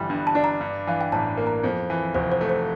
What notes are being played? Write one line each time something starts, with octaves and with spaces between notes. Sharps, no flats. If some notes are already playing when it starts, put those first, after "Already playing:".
Already playing: G1 E3 G3
G2
A5
D4
A#5
G2
E3 F5
G5
A1 A5
A#3
A#5
F2
E3
F1 C5
C5
A3
C5